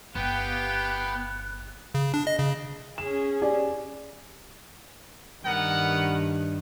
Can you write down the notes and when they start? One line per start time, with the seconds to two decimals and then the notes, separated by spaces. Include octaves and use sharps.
0.15 G1 B3 G4 F5 G5 F#6
1.95 C#3
2.14 D4
2.27 D#5
2.39 C#3
2.98 C#4 G#4 E7
3.42 G4 D5 G#5
5.44 G2 D#3 B3 A#4 F#5